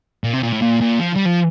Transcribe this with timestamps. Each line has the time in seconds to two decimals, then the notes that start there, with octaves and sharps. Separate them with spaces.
0.24 A#2
0.33 C3
0.43 A#2
0.52 A2
0.62 A#2
0.81 A#2
1.00 F3
1.16 G3
1.26 F3